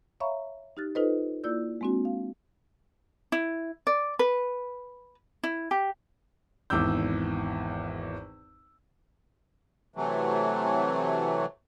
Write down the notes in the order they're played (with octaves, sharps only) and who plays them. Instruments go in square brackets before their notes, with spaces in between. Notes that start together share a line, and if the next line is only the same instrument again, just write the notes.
[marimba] C#5 E5 F5 A#5 B5 C#6
D#4 G4 F6 F#6 A6
D#4 F4 A4 B4 C5 D#5
A#3 E4 F4 D5 E6 G6
G#3 A#3 C4 D4 F#4
F5
[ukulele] E4
D5
B4
E4
G4
[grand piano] G#1 E2 D6 E6 G6
[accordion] C3 E3 F#3 A3